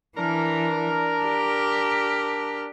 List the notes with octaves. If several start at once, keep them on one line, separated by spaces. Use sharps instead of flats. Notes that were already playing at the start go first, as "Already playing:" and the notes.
E3 D4 A#4
G4